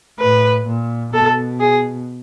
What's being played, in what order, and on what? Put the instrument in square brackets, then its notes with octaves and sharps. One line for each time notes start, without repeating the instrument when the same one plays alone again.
[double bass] A2 [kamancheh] B4
[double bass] A#2
[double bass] B2 [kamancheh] A4
[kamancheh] G#4